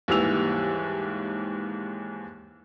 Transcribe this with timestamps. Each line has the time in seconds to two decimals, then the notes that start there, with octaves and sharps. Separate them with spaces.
0.08 D#2 G#2 E3 G3 E6 F7